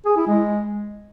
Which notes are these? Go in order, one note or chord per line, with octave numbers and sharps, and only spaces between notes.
G#4
E4
G#3